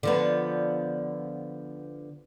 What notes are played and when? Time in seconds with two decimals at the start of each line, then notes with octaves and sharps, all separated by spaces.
0.03 D3 F3 B3